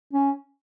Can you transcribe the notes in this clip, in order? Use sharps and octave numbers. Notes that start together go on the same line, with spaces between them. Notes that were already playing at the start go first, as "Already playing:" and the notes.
C#4